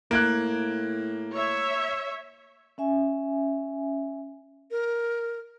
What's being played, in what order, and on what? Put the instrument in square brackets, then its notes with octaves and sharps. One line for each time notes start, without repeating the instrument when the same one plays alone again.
[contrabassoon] A2 [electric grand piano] A#3 [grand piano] F#6 G#6 D7
[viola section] C#5 E5
[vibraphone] C#4 E5 G#5
[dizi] A#4